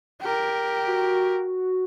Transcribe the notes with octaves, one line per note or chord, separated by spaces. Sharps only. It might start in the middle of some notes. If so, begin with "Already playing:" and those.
G4 A#4
F#4